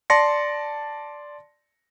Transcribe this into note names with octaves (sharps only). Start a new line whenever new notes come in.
D5 A5 C6 A#6 C#7